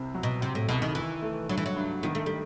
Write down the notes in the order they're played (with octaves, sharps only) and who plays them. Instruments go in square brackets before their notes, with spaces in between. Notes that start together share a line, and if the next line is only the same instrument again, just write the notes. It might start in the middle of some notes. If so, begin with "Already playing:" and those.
Already playing: [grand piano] C2 C3 C4
F#3
[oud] B2
[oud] C3 [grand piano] C4
[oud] A2
[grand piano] C2 [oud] B2
[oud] D#3
[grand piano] D#3 [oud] E3
[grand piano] A3
[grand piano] G2 [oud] F#3
[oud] E3
F#3
[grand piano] G2
[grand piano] D#3 [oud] B3
[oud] A3
G3